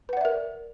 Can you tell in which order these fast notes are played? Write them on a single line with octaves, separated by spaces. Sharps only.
B4 F#5 D5 E5 A#4